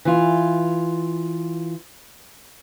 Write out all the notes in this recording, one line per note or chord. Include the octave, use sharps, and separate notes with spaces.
E3 F4